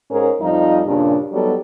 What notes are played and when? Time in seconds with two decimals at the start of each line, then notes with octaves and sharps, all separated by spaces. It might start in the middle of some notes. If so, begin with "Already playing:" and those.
0.11 G#2 C#4 G#4 A#4
0.41 F2 F3 G3 D#4 F4
0.85 G2 A#2 C#3 D4
1.32 F#3 G3 B3 D#4 A4